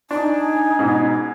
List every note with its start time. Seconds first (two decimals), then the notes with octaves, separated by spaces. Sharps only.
0.11 D4 D#4 G#5
0.79 G#2 B2